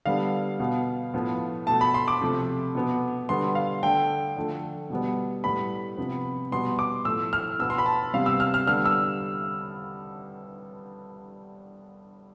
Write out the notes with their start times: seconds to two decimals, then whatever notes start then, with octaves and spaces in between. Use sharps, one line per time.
0.06 D3 G3 B3 F5
0.60 B2 B3
1.14 A2 F3 B3
1.67 B2 A3 A5
1.81 B5
1.94 C6
2.08 D6
2.21 C3 F3 A3
2.75 B2 B3
3.29 D3 G3 B3 C6
3.55 F5
3.82 D3 A3 G5
4.37 D3 F3 A3
4.90 B2 G3 B3
5.44 A2 G3 B3 B5
5.97 C3 F3 B3
6.51 B2 G3 B3 C6
6.79 D6
7.05 A2 F3 A3 E6
7.33 F6
7.59 B2 B3 E6
7.70 C6
7.78 B5
7.86 A5
8.14 C3 G3 B3 F5
8.26 E6
8.40 F6
8.54 F6
8.67 D3 G3 B3 F6
8.86 E6